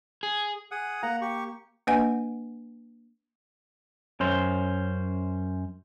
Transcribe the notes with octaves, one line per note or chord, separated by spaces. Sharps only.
G#4
G#4 F#5 D#6
A#3 F#5 A#5
G4 C#6
A#3 D4 B4 D#5 F#5 G#5
F#2 C#4 C5